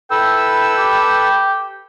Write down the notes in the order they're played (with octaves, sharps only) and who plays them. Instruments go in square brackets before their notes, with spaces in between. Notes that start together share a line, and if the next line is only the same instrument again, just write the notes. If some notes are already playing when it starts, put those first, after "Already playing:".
[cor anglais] E4 [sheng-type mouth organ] A4 B4 E6 [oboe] G5
[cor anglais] G4